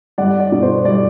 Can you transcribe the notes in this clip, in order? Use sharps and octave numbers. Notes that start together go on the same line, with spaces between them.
G3 D5 F#5
D5
B2
C5
G3 D5